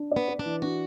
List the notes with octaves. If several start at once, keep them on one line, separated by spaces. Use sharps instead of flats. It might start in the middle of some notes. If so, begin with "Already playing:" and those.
Already playing: D4
B3 D5
B4
D4
E3
D4 F#4